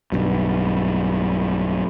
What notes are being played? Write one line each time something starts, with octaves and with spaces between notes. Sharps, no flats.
B1 G2